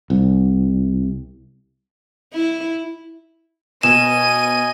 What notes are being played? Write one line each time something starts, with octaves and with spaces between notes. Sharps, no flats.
C2
E4
B2 D#5 G#5 D#7 E7